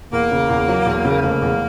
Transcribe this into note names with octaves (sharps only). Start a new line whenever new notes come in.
E2 A#3
C#3
E2
F#3
E2
C#3
F1 A#3
E2